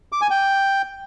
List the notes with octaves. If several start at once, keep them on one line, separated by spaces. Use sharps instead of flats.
D6
G#5
G5